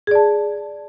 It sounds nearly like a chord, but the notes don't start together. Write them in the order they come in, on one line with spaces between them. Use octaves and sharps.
G#4 D5 A5